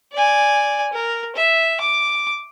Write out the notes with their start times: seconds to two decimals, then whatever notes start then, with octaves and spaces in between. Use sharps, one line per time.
0.12 D5 G#5
0.93 A#4
1.35 E5
1.81 D6